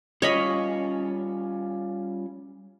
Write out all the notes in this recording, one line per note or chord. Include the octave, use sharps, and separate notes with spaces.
G3 C#4 F4 C#5 D#5 B5